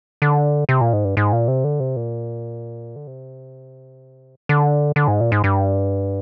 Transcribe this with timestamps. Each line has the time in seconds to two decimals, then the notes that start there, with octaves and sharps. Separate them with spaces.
0.22 D3
0.69 C3
0.81 A#2
0.93 G#2
1.05 G2
1.17 G#2
1.32 A#2
1.48 C3
1.64 D3
1.80 C3
1.96 A#2
2.96 D3
3.07 C3
4.49 D3
4.96 D3
5.08 G#2
5.21 A#2
5.32 G#2
5.44 G2